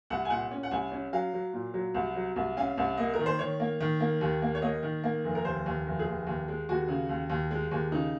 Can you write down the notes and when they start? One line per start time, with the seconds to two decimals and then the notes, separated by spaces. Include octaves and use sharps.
0.10 C2 F#5
0.25 G#5
0.30 A#2 F#5
0.51 C#4
0.63 F#5
0.71 C2 G#5
0.92 C#4
1.13 F#3 F5
1.34 F#3
1.53 A#2
1.74 F#3
1.94 C2
2.16 F#3
2.36 C2
2.57 C#4 F5
2.78 C2
2.97 A#3 D#5
3.14 A#4
3.19 D#3
3.26 C5
3.39 D#3 C#5
3.60 A#3
3.80 D#3
4.00 A#3
4.21 D#2
4.42 A#3
4.55 C#5
4.62 A#3 D#5
4.83 D#3
5.04 A#3
5.24 F1
5.35 A#4
5.45 D#2 C5
5.66 D#2
5.87 F1
5.99 G#4
6.07 D#2
6.27 D#2
6.48 G#3
6.69 D#2 F#4
6.88 C#3
7.09 D#2
7.30 D#2
7.51 G#3
7.71 D#2
7.92 C#3 D#4